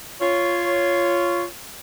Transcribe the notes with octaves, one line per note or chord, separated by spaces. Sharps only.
F4 C#5